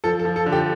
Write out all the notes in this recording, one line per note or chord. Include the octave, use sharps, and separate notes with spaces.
F3 A4
A4
F3
A4
D3
G4